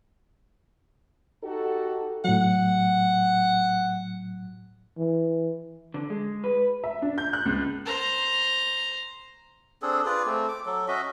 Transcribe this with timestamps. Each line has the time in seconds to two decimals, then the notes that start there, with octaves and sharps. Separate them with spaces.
1.43 D#4 F#4 G4 A4
2.25 A2 F#3 F#5
4.98 E3
5.94 D3
6.10 G#3
6.44 B4
6.84 E5
7.02 D4
7.18 G6
7.33 F#6
7.46 C#2
7.85 C5 A#5
9.82 C4 D4 G#4 A4
10.06 F4 G#4 B4 D5
10.26 A3 C4
10.48 D6
10.66 F#3 A4
10.88 C#4 F#4 D#5 E5